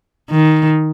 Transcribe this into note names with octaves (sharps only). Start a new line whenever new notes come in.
D#3